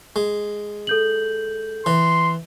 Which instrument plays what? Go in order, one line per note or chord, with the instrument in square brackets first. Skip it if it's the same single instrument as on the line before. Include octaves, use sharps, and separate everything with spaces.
[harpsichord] G#3
[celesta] A4 G6 F#7
[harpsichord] E3 [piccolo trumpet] C6